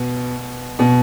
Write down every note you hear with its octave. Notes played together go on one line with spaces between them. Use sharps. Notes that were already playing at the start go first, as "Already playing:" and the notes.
Already playing: B2
B2